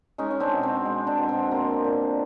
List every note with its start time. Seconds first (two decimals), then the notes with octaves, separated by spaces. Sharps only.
0.18 G#3 C#4 D#4
0.31 C#4
0.40 C4 D4
0.51 B2
0.63 C4
0.85 G#3
1.07 C4 D4
1.18 B2
1.29 C4
1.51 A#3 C4
1.84 A#2